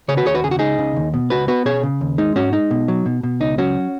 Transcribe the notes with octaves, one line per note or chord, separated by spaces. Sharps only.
C#3 G#4 C#5
F#4 B4
D#2 G#4 C#5
F#4 B4
C#3 G#4
F#4
C#2 D#4 G#4
C#3
D#2
B2
C#2 F#4 B4
B3 F#4 B4
B2 G#4 C#5
C#3
D#2
G#3 D#4
G#2 C#4 F#4
G#3 D#4
B2
F#3
B2
B2
C#2 D#4
F#3 C#4 F#4